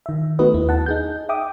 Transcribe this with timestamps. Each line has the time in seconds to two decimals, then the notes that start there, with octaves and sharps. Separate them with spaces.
0.06 D#3 E5
0.39 A3 B3 D#4 F#4 B4 D#5
0.54 D#2 E4
0.69 F#5 A5
0.86 D#4 G#4 G6
1.29 E5 G5 D6 D#6